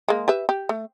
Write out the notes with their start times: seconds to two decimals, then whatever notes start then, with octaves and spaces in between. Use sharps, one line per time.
0.08 G#3 A#3
0.28 G4 B4 E5
0.49 G4
0.69 A3